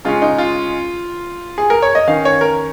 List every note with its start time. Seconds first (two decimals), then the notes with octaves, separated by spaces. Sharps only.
0.05 C#3 G#3 C#4 F4
0.22 D#4
0.38 F4
1.58 G#4
1.70 A#4
1.82 C#5
1.95 D#5
2.07 D#3 C#4 F5
2.25 C#5
2.41 A#4